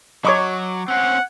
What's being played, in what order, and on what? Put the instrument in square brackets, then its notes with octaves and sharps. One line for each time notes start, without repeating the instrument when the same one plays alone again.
[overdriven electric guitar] F#3 [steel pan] C#5 D#5 [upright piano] C#6 D6 G#6
[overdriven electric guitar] C4 C#4 [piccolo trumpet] F#5